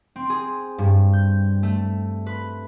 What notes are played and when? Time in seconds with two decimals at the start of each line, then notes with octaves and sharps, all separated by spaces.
0.16 C4
0.30 G#4
0.78 G2
1.13 G6
1.63 A3
2.26 B4